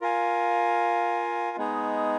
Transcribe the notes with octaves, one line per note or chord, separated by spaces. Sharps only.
F4 A#4 F5 G#5
G#3 B3 D#4 G#4